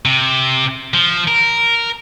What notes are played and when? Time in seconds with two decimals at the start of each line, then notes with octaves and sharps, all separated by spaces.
0.05 C3
0.94 F3
1.27 A#4